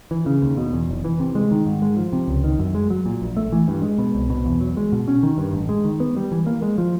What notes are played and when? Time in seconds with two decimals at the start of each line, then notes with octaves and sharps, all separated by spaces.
0.11 E3
0.26 C#3
0.42 D#2
0.57 B2
0.73 E2
0.89 F1
1.05 E3
1.20 C3
1.35 G#3
1.51 D#3
1.66 G#2
1.82 G#3
1.97 F3
2.13 C3
2.28 C#2
2.44 D#3
2.59 F#2
2.75 G#3
2.90 F#3
3.06 A#2
3.22 A#1
3.37 A3
3.52 E3
3.68 G2
3.83 G#3
3.98 B2
4.15 C2
4.30 B2
4.46 E2
4.61 F#3
4.77 G#3
4.92 B2
5.08 C#4
5.23 D#3
5.38 G2
5.53 A1
5.69 G#3
5.85 D#3
6.00 B3
6.17 G3
6.32 E3
6.47 A#3
6.62 G#3
6.78 F3